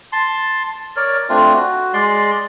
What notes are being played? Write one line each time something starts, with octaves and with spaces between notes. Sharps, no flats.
A5 C6
A#4 C#5 D5
A3 C4 D4 F4
F#4
G#3 D5 C6